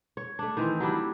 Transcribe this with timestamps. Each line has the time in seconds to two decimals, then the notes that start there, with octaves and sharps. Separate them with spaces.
0.17 C#5
0.39 A3 D4
0.57 D#3 E3 C4
0.80 F#3 G3 D4 E4